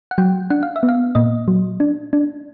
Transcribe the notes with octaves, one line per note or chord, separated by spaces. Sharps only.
F#5
F#3 G5
D4 F#5
F5
E5
B3
F5
A#2 D#5
F#3
D4
D4